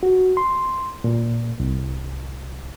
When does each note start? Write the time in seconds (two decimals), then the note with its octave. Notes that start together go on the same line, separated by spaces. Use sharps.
0.03 F#4
0.37 C6
1.04 A#2
1.60 C2